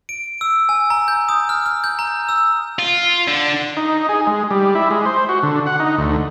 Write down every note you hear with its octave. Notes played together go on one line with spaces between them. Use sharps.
D7
E6
G#5
A#5
G6
D#6
F6
F6
G6
A#5
E6
F4
D3
D#4
G#4
G#3
G3
E4
G#3
C5
F#4
D3
F#5
D#4
D2